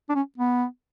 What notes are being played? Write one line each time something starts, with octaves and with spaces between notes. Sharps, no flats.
D4
C#4
B3